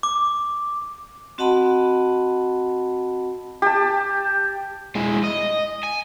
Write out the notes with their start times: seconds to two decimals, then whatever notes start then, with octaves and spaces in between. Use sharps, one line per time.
0.03 D6
1.38 C4 F#4 D#5 F#5 A5 B5
3.62 G4 A5
4.95 G#3 E4
5.23 D#5
5.84 G#5